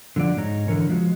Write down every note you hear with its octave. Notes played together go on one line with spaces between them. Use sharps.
D3 F3 F#3 D5 F#5
G#2 D#4 C#5 A#5
D3 E3 A#4 C#5
F3 G#3 F#4